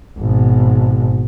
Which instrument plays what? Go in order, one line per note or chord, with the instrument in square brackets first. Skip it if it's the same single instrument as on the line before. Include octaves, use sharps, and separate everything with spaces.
[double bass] G#1 B2